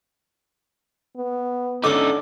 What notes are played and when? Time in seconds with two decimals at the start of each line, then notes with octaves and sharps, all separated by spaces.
1.17 B3
1.84 D3 C#4 D#4 A4 D6